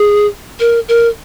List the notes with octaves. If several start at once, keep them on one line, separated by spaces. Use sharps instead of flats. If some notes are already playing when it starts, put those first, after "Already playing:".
Already playing: G#4
A#4
A#4